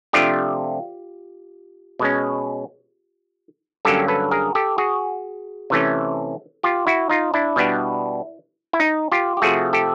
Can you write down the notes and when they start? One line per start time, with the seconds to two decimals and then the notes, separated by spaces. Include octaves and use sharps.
0.13 C3 F3 A3 D4 F4 G4
1.99 B2 G#3 C#4
3.85 G2 D3 F#3 A#3 C#4 G4 A4
4.08 A4 B4
4.31 G#4 A#4
4.55 G4 A4
4.78 F#4 G#4
5.70 C3 E3 A3 C#4
6.63 F4 G4
6.87 E4 F#4
7.09 D#4 F4
7.34 D4 E4
7.56 B2 G3 B3 D4
8.73 E4
8.80 D#4
9.12 F4 G4
9.37 G4
9.42 C3 F3 A3 F#4 G#4
9.73 G4 A4